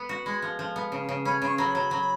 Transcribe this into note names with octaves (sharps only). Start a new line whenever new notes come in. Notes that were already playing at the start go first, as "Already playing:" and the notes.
Already playing: B3
F#4
G#3 B5
F3
F3
B3
C#3
C#3
C#4 B5
C#3 B5
C#6
F#3 B5
F#3
F#3